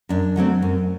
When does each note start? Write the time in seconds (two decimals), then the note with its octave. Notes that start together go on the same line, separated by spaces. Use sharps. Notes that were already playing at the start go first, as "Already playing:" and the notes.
0.09 F#2 D4
0.36 D3 F#3 A3 C4
0.62 F#2